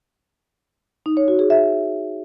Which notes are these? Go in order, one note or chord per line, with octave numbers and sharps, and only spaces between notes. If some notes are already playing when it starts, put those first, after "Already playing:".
D#4
C#5
F#4
G#4
E5